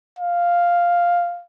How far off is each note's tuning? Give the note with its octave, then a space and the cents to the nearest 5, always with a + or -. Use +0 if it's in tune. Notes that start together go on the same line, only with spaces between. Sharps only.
F5 +0